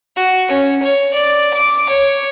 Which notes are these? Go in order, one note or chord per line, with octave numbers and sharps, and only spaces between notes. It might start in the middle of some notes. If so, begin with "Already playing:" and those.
F#4
C#4
C#5
D5
D6
C#5